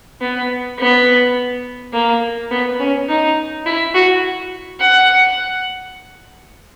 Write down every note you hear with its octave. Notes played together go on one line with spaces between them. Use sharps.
B3
B3
A#3
B3
C#4
D#4
E4
F#4
F#5